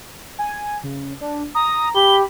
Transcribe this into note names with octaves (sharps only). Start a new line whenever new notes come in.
G#5
C#3
D4
A#5 D#6
G4 B5 G7